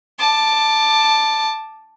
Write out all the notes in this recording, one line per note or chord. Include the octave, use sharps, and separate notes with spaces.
A5 D6